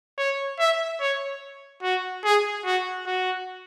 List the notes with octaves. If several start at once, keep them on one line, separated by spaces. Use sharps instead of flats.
C#5
E5
C#5
F#4
G#4
F#4
F#4